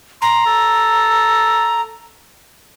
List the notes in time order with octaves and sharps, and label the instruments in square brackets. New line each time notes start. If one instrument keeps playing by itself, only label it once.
[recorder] A#5 [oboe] C6
[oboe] A4